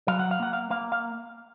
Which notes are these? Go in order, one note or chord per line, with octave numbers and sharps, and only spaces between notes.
F#3 F5
F#5
F5
A#3 F#5
F5
A#3 F5
F5